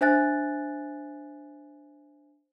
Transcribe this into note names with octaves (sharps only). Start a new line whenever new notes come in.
D4 C5 E5 G#5 F#6 A6